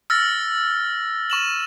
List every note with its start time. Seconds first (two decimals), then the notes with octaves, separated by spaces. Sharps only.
0.10 E6 F6 A6 A#6
1.30 C#6 E7 F#7